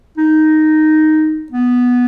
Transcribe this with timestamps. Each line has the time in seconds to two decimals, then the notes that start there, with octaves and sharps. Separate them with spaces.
0.18 D#4
1.52 B3